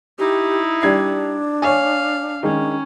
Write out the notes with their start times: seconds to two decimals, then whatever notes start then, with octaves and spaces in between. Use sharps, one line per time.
0.19 D#4 E4 G4
0.82 G3 D4 G#6 C7
1.62 C#5 F5 G#5
2.43 D#3 G#3 C#4